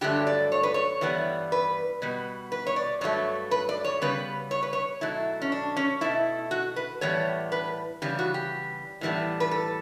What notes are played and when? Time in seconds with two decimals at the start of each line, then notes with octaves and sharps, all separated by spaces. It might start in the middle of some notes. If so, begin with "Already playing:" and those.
0.01 G2 D3 F#3 A3 G4
0.27 D5
0.52 C#5
0.63 B4
0.74 C#5
1.01 G2 E3 G3 B3
1.52 B4
2.02 B2 G3 B3
2.52 B4
2.67 C#5
2.76 D5
3.01 G2 F#3 A3 C#5
3.51 B4
3.69 D5
3.85 C#5
4.02 C#3 G3 B3 B4
4.51 C#5
4.63 B4
4.73 C#5
5.01 B2 F#3 A3 E4
5.42 C#4
5.52 D4
5.76 C#4
6.01 B2 A3 E4
6.51 F#4
6.76 B4
7.01 A2 E3 G3 B3 C#5
7.52 B4
8.02 C#3 E3 G3 B3 G4
8.19 F#4
8.34 G4
9.01 A2 E3 G3 B3
9.40 B4
9.51 A4